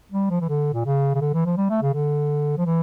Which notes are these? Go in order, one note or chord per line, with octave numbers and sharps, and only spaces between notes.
G3
F3
E3
D3
A#2
C#3
C#3
D3
E3
F3
G3
A3
C#3
D3
F3
E3